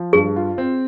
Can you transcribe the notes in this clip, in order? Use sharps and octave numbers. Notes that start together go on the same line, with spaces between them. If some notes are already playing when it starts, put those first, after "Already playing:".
Already playing: F3
G2 G#4
F4
C4